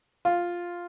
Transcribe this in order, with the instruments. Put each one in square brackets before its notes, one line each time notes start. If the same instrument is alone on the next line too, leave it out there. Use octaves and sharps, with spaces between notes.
[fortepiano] F4